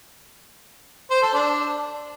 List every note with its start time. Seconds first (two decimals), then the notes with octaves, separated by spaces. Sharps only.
1.11 C5
1.22 A4
1.34 D4